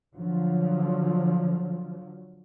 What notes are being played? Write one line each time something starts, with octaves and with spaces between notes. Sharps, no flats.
D3 F3 F#3